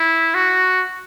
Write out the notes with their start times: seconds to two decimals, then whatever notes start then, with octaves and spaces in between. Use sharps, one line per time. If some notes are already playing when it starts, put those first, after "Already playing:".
Already playing: E4
0.34 F#4